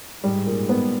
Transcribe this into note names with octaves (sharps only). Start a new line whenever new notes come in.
G#2 G3
A#2
B3